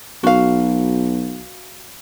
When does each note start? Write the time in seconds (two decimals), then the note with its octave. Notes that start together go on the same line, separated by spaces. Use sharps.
0.23 B1 F#4 F5